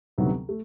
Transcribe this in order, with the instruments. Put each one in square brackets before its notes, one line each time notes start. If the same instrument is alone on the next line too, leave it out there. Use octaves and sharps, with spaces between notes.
[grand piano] D2 C3 D#3 F#3 B3
A3